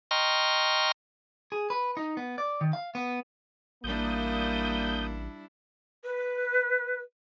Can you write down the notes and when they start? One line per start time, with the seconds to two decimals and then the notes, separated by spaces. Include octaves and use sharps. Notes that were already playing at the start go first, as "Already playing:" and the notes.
0.11 D#5 G5 A#5 C6 C#6 F6
1.52 G#4
1.70 B4
1.97 D#4
2.17 B3
2.38 D5
2.61 D#3
2.73 F5
2.95 B3
3.84 A1 G3 A#3 D4 E4 D#6 G6
6.04 B4